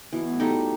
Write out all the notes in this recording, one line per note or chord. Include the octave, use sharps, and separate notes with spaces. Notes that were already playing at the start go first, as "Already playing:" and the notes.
B2 E3
A2
G3 D#4 A4
A2